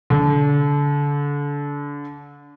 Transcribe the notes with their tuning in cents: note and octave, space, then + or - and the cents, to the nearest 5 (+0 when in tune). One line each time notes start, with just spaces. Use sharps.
D3 -30